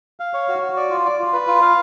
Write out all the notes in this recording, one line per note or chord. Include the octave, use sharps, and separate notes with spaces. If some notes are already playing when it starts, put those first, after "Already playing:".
F5
C#5
F#4
F#4
D5
F4
D5
F4
B4
F4
F5